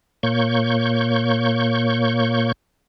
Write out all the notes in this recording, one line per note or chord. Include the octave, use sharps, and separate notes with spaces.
A#2 A#3 C#5 C#6 G6